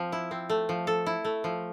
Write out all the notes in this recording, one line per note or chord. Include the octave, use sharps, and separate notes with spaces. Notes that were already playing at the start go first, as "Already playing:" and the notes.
Already playing: F3 C4
E4
C4
A3
F3
A4
E4
A3
F3